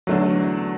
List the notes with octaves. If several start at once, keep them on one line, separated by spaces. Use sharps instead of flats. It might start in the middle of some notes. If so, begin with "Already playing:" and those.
E2 D3 F#3 A3 D4 F#4